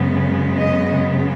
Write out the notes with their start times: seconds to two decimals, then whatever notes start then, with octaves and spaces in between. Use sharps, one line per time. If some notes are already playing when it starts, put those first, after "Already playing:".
Already playing: F#2 C#3 G#3 B3
0.60 D#5